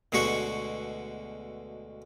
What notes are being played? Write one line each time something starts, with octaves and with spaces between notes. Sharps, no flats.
D2 B2 G#3 F#4 C#6